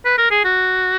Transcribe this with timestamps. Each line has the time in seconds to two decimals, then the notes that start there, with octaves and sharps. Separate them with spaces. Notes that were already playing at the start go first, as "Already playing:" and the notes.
0.05 B4
0.18 A#4
0.31 G#4
0.45 F#4